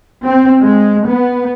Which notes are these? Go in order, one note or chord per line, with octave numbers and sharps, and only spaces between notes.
C4
G#3
B3